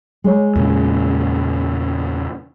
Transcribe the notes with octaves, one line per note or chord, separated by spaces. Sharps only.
G#3 C#5
E2 A#2 C#3